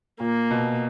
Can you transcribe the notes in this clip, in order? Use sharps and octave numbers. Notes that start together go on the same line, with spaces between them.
A#2 A#3
B2